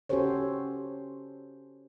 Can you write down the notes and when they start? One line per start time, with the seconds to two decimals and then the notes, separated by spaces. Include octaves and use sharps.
0.09 C#4 F#4 G4 A4 C5 C#5